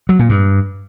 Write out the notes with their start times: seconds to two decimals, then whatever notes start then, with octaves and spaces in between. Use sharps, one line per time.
0.09 F#3
0.19 A#2
0.29 G2